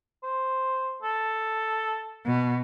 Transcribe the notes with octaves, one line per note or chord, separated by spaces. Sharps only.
C5
A4
B2